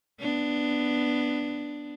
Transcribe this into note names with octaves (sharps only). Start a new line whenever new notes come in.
B3 D4